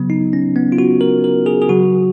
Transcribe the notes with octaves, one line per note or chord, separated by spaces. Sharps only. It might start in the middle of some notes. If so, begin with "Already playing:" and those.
Already playing: C#3 F#3 B3
D#4
C#4
B3
F4
F#4
A#4
A#4
G#4
G#4
C#3 F#3 F#4